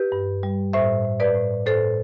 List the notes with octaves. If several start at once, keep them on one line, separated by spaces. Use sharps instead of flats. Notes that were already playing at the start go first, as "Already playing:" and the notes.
Already playing: G4 B4
G2
G3
A2 C5 E5
A2
B4 D5
A2
A2 A4 C5